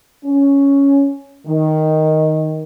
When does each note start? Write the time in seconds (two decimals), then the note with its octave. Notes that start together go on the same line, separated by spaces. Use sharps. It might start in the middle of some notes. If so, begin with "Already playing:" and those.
0.25 C#4
1.47 D#3